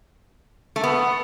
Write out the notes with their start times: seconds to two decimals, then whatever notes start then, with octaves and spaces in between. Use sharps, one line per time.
0.76 A3
0.84 B3